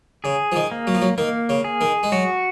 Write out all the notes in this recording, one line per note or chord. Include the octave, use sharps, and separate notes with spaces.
C#3 G#4
F3
D#3
A#3
F#3
F3
F#3
D#3 A#3
C#3
G#4
D#3
G#3
F#3 F#4